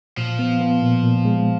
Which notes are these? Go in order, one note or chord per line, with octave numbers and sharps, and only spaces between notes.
A#2 F3
B3
B3
A#2
A#2
G#3